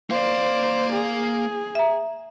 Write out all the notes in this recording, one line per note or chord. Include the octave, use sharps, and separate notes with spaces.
A#3 C5 D5 F5
G#4
E5 A#5